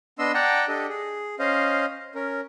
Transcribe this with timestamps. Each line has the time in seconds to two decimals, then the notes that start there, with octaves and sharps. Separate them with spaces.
0.19 B3 D4 D#5 C6 E6
0.34 D5 F#5 G5 A5 A#5
0.68 D4 G4 A4 D#5
0.89 G#4
1.39 C#4 C5 D#5 F5
2.15 C#4 A#4